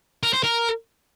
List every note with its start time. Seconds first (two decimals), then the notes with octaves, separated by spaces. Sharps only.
0.23 A#4
0.33 C5
0.44 A#4